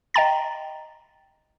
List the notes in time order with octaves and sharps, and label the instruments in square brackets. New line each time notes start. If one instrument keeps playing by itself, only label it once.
[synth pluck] D#5 G5 A#5 A6